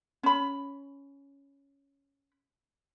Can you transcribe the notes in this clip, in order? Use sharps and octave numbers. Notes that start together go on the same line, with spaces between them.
C#4 B5